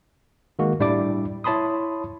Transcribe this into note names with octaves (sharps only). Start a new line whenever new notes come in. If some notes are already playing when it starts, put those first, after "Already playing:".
D#3 G#3 A#3 F#4
A2 G3 D4 E4 D5 D6
E4 C#5 A5 B5 C6 D#6